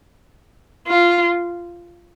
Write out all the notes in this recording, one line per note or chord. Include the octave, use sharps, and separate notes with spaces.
F4